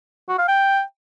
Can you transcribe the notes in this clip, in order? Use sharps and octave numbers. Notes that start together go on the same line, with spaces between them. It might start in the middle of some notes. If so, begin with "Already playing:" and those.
F#4
F5
G5